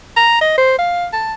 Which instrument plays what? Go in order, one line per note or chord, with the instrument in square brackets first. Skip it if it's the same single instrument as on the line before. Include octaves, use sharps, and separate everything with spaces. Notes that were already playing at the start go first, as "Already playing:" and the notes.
[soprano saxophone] A#5
D#5
C5
F5
A5